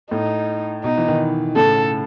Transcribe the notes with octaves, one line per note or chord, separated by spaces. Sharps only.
A2 D#4
B2 D#4
E3
B2 D#3
A2 C#3 A4